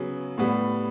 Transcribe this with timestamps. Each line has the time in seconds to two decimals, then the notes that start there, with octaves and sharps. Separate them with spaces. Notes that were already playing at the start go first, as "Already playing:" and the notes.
Already playing: C#3 F#3 B3
0.38 A2 G3 B3